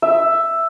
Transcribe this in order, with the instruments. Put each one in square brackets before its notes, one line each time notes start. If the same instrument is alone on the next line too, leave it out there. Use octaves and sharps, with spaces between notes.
[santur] E5